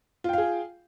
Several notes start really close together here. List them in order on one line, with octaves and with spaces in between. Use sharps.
F4 G5 F5 G#4